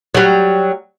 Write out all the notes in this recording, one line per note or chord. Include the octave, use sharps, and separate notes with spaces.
F#3 G3